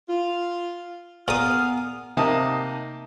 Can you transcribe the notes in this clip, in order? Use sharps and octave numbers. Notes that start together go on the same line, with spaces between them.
F4
A#2 B3 G#4 A#4 F5 D#6 F6
C3 A#3 D#4 A5 D#6